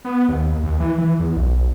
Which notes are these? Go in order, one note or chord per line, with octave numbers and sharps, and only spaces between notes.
B3
D#2
D#2
E3
E3
E2
B1